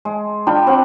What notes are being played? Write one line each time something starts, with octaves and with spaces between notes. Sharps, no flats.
G#3
D4 F4 G5 B5
C4 F#5